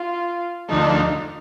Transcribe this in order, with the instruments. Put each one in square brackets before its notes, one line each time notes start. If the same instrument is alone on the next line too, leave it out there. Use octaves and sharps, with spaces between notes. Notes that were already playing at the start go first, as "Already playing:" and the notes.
Already playing: [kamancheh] F4
[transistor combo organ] D2 D3 F3 A3 [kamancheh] D#4